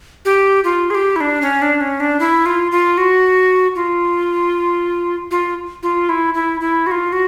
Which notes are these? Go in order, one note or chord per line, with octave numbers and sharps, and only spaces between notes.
G4
F4
G#4
G4
E4
D4
C#4
D4
C#4
D4
E4
F4
F4
F#4
F4
F4
F4
E4
E4
E4
F#4
F4
F#4